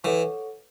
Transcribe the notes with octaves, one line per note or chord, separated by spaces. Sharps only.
E3 A4 C#5 F#5 C#6